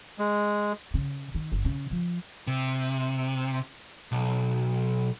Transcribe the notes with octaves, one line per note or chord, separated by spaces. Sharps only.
G#3
C#3
D#3
G1
C#3
F3
C3
B1